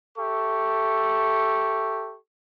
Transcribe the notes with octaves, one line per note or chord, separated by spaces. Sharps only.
G4 A4 E5 C#6